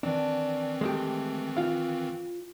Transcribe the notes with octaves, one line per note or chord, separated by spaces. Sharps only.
D#3 E3 C4 D4
G#3 A3 G4
F4 F5